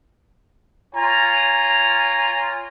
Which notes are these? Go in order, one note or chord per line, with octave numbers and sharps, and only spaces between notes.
F4 C#5 G#5 A#5